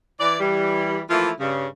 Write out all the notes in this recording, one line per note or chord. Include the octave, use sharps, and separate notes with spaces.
E3 D5
E3 G3
E3 F3 A3 A#3 E4 F4
G2 C#3